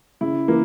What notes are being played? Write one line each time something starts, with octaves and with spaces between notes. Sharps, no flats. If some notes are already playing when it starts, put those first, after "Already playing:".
C#3 E4
E3 A#3